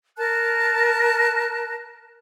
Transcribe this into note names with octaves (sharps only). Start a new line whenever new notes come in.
A#4 A5 F#6